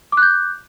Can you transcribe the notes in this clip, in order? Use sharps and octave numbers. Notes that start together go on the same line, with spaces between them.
D6 F#6 G6